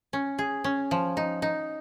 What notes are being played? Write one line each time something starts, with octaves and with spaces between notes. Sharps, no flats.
C#4
G#4
C#4
F3
D#4
D#4